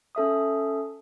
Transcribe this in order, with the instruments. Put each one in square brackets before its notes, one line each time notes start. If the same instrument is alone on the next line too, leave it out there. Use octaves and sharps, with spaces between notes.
[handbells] C#4 A4 E5 D#6